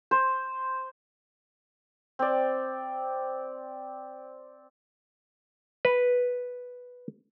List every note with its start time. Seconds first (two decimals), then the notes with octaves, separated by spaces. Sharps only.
0.11 C5
2.19 C4 D5
5.85 B4